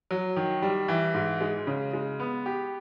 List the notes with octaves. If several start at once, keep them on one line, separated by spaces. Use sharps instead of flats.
F#3
D#3
G3
E3
G#2
G#3
C#3
G#3
B3
G4